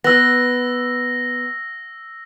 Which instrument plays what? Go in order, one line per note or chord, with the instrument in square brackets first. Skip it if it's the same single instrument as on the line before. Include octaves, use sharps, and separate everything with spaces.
[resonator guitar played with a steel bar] B3 [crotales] E6 A#6